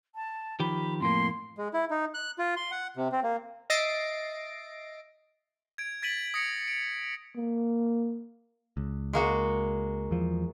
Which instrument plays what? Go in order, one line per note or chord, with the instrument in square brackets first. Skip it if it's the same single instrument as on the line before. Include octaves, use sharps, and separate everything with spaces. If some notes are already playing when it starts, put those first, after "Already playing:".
[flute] A5
[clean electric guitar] D#3 F3 G4 [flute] B5
[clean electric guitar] F2 A2 A#3 [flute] C6
[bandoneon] G#3
E4
D#4
F#6
F4
C6
F#5
C3
C4
A#3
[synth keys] D#5 E5 A6 A#6 C7 D7
[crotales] G#6 D7
G#6 A6 B6 D7 D#7 F#7
D#6 A#6 C#7
D7
[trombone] A#3
[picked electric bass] C#2
[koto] G#3 A#3 F#4
[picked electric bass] E2 F3